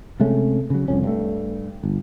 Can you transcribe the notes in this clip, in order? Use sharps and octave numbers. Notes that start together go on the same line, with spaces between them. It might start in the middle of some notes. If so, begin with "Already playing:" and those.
C3 G#3 A3 C#4
C#3 F#3
C2 F2 C#4
G2 A3
G1